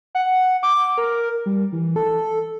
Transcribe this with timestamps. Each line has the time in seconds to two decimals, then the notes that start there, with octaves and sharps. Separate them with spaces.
0.15 F#5
0.63 D6
0.98 A#4
1.46 G3
1.72 E3
1.96 A4